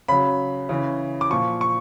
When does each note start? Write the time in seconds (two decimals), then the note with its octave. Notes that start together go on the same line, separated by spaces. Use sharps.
0.08 C#3 F#3 B5
0.69 C#3 E3
1.21 D6
1.30 A#2 F3 C#6
1.61 C#6